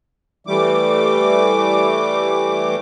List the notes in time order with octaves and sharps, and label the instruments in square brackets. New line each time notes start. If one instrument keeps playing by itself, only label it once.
[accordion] E3 G3 A3 D6